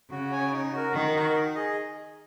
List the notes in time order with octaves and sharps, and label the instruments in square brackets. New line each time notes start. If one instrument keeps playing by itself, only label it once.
[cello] C#3 [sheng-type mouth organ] F#4
[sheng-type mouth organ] C#5 G#5
D#4
F#4 A#4
[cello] D#3 [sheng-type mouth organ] D#4
[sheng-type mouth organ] F#4 A#4
D#4
G#4 D#5